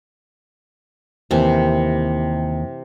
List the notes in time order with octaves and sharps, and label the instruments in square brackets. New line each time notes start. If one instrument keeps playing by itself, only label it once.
[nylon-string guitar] D#2 [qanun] C3 E3